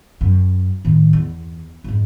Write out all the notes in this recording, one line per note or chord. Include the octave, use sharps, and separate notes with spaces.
F#2
A2 D#3
E2
F2 G#2